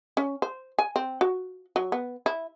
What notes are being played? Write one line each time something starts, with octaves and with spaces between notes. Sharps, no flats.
C#4
C5
G#5
C4
F#4
F#3
B3
E4